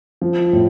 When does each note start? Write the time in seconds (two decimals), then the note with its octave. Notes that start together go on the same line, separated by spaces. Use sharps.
0.22 F3
0.53 A2